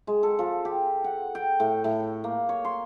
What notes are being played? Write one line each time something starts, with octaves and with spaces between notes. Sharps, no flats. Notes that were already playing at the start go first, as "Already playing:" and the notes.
G#3
A4
F3
G4
F#5
G5
A2
A2
A#3
C#5
C6